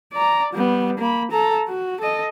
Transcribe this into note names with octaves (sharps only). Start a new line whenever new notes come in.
D5 A#5
G3 B3
A#3 B5
A4 A#5
F#4
A4 D#5